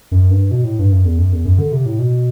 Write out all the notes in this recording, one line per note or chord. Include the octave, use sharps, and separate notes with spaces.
F#2
G2
B2
A2
G2
F#2
E2
F#2
E2
F#2
D3
C3
A2
B2